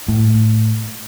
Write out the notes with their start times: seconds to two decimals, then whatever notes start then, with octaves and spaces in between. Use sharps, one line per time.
0.08 A2